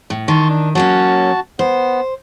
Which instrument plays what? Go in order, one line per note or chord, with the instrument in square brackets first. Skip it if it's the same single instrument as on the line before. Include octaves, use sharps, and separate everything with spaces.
[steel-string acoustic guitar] A2
[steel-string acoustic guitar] D#3 [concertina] A5 C6 C#6
[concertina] D4
[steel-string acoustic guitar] F#3 A#3 C#4 [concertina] F#4 A5
[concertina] B3 [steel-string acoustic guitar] C5